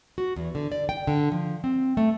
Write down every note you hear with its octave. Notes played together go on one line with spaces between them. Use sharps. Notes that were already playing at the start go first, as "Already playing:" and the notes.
F#4
E2
D3
D5
G5
D3
F3
C4
A3